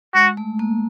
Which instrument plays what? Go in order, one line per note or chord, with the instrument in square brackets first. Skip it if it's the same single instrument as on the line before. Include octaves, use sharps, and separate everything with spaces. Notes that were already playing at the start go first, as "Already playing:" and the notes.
[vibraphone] G#3 [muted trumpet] F#4
[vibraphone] A3
A#3